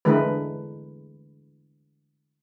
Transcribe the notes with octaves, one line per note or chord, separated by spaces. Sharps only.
D3 E3 G#3 A#4 B4